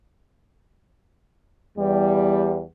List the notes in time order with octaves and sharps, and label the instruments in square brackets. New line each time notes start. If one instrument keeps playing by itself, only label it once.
[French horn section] E2 G3